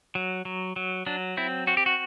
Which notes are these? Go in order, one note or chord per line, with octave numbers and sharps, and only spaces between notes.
F#3
F#3
F#3
F#3 D4
C4 E4
C4 F#4
G4
F#4